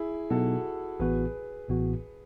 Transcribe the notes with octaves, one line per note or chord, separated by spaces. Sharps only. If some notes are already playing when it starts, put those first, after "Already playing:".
Already playing: E4 G#4
B2 F#3 B3 D#4 F#4 A4
A1 A2 E3 B3 F#4 G#4 B4
A1 A2 E3 B3 F#4